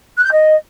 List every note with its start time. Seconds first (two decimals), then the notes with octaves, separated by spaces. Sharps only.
0.18 F#6
0.25 G6
0.32 D#5